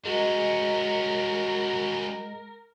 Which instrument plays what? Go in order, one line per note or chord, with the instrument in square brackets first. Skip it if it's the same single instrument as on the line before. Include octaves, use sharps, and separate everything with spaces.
[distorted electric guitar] G3 C#4 [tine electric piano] G#3 [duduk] F#4 [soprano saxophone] A#4